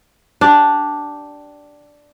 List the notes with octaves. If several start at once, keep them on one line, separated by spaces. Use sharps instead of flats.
D4 G4